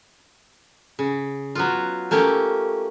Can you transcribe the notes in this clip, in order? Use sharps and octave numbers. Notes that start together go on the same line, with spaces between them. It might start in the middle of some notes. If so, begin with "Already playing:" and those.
C#3
F#3 B3 F4
A3 A#3 C#4 G4